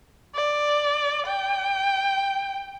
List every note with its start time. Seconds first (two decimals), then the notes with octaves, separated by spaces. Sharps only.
0.35 D5
1.26 G5